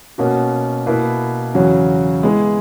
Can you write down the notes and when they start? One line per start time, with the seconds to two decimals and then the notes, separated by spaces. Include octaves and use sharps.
0.18 B2 A#3 C#4 F#4
0.86 B2 A#3 E4 B4
1.54 E2 C#3 F#3 C#4 F#4
2.23 G#3 B3 E4 G#4